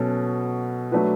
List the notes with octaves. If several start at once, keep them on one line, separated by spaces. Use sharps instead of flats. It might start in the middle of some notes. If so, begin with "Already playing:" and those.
Already playing: B2 F#3 C#4 F#4 A4
F#3 A3 D4 F#4 B4